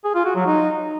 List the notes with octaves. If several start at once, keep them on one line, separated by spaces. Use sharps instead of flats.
G#4
F4
F#4
F#3
D#4